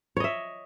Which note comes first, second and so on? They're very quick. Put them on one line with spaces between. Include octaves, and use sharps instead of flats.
C#5 D#5 E5